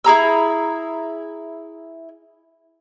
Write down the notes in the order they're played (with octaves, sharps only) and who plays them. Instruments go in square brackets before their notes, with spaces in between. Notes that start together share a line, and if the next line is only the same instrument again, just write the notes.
[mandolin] E4 G#4 A#5 E6